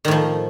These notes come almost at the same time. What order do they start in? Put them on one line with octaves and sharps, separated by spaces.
D#3 A2 F3